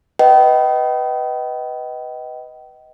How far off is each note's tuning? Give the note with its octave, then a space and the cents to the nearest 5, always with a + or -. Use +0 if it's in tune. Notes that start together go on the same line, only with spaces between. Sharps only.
B4 +0 D#5 +10 G5 -35